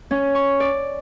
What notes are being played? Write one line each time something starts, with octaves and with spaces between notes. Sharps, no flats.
C#4
C#6
D5